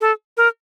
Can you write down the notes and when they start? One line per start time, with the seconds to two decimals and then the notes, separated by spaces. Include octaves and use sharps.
0.01 A4
0.37 A#4